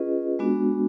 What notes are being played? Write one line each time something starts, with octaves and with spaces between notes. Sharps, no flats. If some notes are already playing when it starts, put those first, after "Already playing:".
Already playing: C#4 F4 G#4 B4 D#5
G#3 B3 D4 F#4